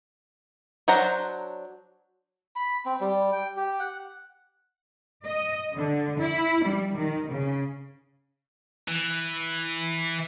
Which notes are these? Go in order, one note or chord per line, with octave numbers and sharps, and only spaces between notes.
F#3 D4 C5 F#5 A#5
B5
C4
G3
G5
G4
F#5
D#5
D3
E4
G3
D#3
C#3
E3